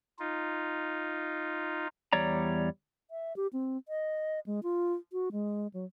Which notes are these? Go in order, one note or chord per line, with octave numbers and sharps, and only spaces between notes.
D#4 F4
E2 G3 C#5 D5 A#5
E5
G4
C4
D#5
G#3
F4
F#4
G#3
F#3